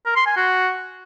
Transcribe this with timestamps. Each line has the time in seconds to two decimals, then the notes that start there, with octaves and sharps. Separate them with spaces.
0.06 A#4
0.16 C6
0.26 G#5
0.36 F#4